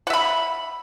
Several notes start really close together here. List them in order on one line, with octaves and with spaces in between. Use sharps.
F#5 E5 B5